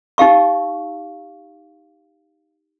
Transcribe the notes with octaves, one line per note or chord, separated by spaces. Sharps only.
D#4 G4 F5 C#6